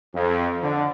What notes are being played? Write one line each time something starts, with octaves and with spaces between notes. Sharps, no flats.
F2
D3